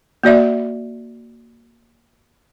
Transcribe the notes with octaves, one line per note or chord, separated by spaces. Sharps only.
A#3 F#4 D5 E5